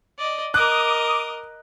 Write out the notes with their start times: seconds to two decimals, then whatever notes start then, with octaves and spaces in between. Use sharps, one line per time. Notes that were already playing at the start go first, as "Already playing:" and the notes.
0.18 D5 D#5
0.54 A#4 D#5 D6 D#6 F#6